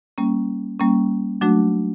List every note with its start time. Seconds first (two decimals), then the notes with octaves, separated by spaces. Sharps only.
0.18 G3 A#3 C#4
0.79 G3 A#3 C#4
1.41 F#3 A3 D4 F#4